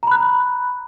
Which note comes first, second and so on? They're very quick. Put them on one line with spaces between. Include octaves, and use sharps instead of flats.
A#5 B5 F#6